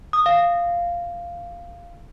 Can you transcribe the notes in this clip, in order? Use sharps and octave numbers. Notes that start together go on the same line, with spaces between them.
D#6
F5